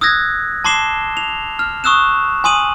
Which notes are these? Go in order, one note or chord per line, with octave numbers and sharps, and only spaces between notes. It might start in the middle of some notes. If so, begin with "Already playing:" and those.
D#6 E6 F#6 G#6 A#6
A5 C6 D6 C7 E7 G7
F7
F6
C#6 D#6 E6 F#6 E7
G#5 C6 D#6 D#7 F#7